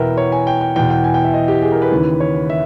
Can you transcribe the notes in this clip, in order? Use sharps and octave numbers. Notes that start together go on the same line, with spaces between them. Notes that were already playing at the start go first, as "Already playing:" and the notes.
Already playing: E2 B2 A#4 B4 E5 G5
C#5
G#5
G5
G5
E2 B2 G5
G5
G#5
G5
E5
D#5
G4
G#4
A#4
B4
D#2 C#3 E3
C#5
E5